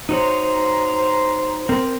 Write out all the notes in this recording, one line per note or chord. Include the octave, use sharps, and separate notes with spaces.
D#4 F#4 C5 C#5 A#5
C4 A#4